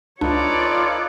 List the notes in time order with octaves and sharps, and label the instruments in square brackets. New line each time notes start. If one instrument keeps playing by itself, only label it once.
[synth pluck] C#2 D4 [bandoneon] D#4 A4 B4 [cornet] F4 [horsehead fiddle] C#5 D5